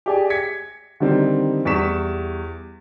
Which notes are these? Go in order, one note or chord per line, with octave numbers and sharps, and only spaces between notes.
G4 G#4 D5 G5 G#5
G#6 B6 C#7
D3 D#3 G3 C4 D#4
E2 G3 C#6 B6 E7